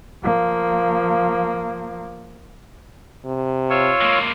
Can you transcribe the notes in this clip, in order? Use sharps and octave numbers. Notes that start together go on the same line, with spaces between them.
F3 A#3
C3
F4 C#5 E6
G#3 A#3